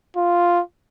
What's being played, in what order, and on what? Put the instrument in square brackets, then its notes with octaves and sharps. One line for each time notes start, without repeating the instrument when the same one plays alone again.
[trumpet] F4